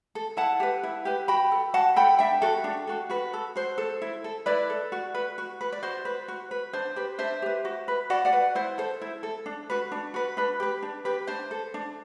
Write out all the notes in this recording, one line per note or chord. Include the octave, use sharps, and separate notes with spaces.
A4
E4 F#5 A5
G4 B4
E4
G4 B4
F#4 G5 B5
A4
F#4 F#5 A5
A4 G5 B5
D4 E5 G5
F#4 A4
D4
F#4 A4
F#4 B4
A4
F#4 C5
A4
E4
A4
E4 B4 D5
A4
F#4
B4
F#4
B4
D5
F#4 C5
B4
F#4
B4
D4 C5
G4 B4
D4 C5 E5
G4 B4
F#4
B4
F#4 D5 F#5
D5 F#5
B4
E4 C5
A4 C5
E4
A4
D4
F#4 B4
D4
F#4 B4
D4 B4
G4 B4
D4
G4 B4
D4 C5
A4
D4